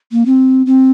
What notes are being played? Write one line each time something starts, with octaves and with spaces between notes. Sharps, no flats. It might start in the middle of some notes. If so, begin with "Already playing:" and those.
A#3
C4
C4